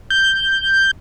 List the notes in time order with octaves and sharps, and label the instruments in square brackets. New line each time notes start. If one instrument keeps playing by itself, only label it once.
[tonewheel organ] G6